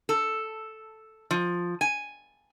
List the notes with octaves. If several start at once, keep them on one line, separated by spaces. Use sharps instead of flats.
A4
F3
G#5